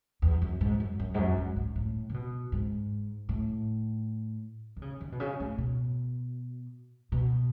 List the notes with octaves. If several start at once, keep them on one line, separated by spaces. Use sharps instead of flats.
E2
F#2
G#2
F#2
F#2
G#2
F#2
G#2
G#2
A2
C#3
B2
G#2
A2
D#3
C#3
D#3
B2
C#3
A2
B2
B2